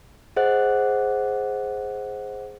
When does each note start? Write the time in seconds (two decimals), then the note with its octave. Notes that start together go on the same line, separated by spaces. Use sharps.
0.36 G#4 C5 D#5 F#5 F#6